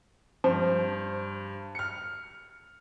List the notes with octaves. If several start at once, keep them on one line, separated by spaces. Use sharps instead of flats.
G2 F3 C5
F6 C#7